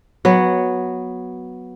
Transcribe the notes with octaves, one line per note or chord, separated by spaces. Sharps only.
F#3 B3